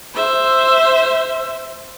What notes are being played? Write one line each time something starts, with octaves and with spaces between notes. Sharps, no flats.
C5 E5